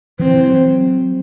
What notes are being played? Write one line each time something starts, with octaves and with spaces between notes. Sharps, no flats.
E3 C4
E3
F#3